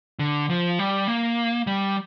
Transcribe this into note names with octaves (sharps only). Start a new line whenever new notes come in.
D3
F3
G3
A#3
G3